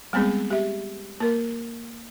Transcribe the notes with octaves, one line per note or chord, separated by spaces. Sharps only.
G3 G#3 B3 C4 G#4
G4 E5
A#3 A#4